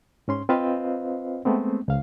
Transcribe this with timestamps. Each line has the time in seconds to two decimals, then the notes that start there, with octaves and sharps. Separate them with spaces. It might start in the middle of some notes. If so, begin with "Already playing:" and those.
0.28 G#2 C#4 C6
0.49 C4 F4 B4 C5 D#5 F5
1.45 G#3 A3 B3 C4
1.88 C#2 F5